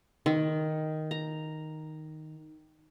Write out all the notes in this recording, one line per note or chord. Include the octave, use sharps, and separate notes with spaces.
D#3
A#5